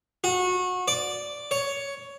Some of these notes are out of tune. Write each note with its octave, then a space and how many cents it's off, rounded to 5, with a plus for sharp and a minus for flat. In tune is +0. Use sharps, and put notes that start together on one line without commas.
F#4 -25
D5 -5
C#5 +10